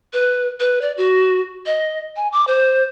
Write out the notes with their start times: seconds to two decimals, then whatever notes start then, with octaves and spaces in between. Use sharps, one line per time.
0.13 B4
0.60 B4
0.81 D5
0.97 F#4
1.66 D#5
2.16 G#5
2.32 D6
2.47 C5